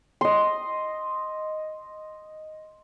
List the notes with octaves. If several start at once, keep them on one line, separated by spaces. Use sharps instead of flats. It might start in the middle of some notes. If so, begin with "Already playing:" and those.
D#5 C6